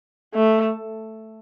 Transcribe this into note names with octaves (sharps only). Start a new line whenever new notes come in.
A3